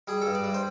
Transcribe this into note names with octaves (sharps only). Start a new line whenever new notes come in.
G3 G#4
A4
G2
D5
G3
C5